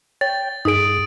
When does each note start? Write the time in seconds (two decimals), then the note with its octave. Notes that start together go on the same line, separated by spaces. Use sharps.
0.21 C#5 G5 A6
0.65 G2 D#4 G#4 D#6 D7